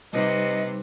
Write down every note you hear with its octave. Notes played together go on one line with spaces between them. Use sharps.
C3 G3 D#4 B4 D#5